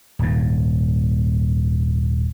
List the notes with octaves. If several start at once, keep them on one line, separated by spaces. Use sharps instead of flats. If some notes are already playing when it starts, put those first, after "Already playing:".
D#1 G#2